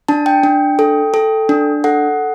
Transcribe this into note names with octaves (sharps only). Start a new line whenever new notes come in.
D4 A5
G5
D4
A4
A4
D4
A4 F#5